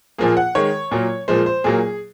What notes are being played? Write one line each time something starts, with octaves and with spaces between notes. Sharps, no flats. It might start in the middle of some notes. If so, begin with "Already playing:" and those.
A#2 F3 A#3 G#4
F#5
D#3 G#3 C#5
A#2 F#3 A#3
A#2 F3 G#3 C5
C5
A#2 F#3 A#3 G#4